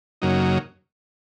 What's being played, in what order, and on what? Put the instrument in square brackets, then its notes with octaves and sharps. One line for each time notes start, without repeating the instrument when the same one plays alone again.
[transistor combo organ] F#2 C#3 F#3 A#3 D#4